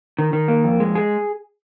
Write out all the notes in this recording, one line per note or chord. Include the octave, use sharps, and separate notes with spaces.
D#3
D#3
A#3
F2
G#3
G#4